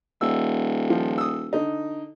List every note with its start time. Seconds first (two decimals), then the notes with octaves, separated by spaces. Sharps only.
0.21 D#1 E6
0.90 F3
1.18 D#6 E6
1.53 D3 D#4